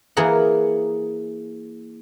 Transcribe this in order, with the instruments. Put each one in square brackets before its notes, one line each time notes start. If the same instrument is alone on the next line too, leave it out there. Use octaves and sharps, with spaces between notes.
[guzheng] E3 A#3 G#4 A#4 F#5